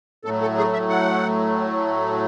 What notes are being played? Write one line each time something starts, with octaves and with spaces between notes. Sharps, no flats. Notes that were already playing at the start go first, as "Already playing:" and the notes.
A2 F#3 A3 A4
A4
G#4
E5
F#5